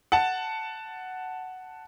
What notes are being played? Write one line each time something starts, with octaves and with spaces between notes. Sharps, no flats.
F#5 A5